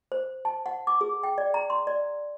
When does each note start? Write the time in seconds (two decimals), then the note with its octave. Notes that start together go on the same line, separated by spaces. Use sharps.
0.12 C5
0.45 A5
0.66 F#5
0.87 D6
1.01 G#4
1.23 G5
1.38 D5
1.54 A#5
1.70 C6
1.87 D5